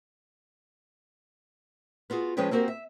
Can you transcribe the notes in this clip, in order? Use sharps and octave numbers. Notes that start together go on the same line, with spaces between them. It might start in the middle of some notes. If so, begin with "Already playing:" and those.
B3 F4 F#4 G#4
F3 G#3 C#4 G#4 B4 G5
A#3 C4 F#4 G4 A#4
E5